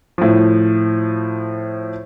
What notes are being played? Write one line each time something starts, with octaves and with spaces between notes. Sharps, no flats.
A2 F3